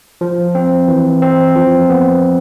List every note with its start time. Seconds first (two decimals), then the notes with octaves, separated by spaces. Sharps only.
0.21 F3
0.55 C4
0.88 E3
1.22 C4
1.56 F3
1.90 B3